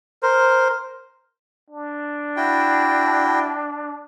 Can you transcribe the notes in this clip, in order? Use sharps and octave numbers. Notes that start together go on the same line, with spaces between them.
A#4 C5
D4
E4 F#4 G5